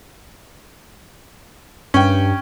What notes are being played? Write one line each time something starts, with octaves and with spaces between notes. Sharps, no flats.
G2 C#4 G5